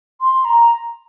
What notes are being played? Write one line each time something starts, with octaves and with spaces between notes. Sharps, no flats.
C6
A#5